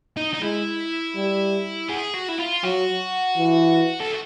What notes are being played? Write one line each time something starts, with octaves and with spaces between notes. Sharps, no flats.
D#4
D#4
G#3 E4
G3
G#4
F#4
E4
F4
F#3 F#4
E3
A4